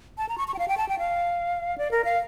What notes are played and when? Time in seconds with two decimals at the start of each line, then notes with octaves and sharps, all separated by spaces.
0.18 A5
0.29 A#5
0.38 C#6
0.48 C#6
0.54 G5
0.59 F5
0.68 G5
0.77 A5
0.89 G5
0.99 F5
1.78 D5
1.91 A#4
2.05 F5